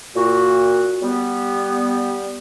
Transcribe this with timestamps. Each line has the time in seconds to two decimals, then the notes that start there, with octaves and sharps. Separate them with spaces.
0.15 A#2 F#4
1.02 G3 B3